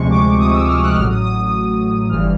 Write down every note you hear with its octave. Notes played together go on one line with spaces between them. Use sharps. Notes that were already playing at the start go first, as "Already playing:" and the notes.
Already playing: D2 C3 F3 G#3 C#6
D6
D#6
E6
F6
F#6
A1 A2 F#3 F6
D#6
D#6
G1 G2 E3 F6